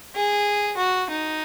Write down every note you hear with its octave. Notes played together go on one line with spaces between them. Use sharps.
G#4
F#4
D#4